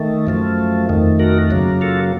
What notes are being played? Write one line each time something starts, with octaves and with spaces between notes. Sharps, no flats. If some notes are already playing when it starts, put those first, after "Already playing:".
Already playing: D#3 A3
F#2 F3 A3
F2 D#3 A3
F#4 A#4
F#2 C#3 F#3 A#3
F4 A4